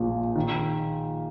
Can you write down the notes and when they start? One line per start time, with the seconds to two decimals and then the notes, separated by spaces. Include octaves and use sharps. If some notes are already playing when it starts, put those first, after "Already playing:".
Already playing: A#1 A#2 F3
0.35 D#3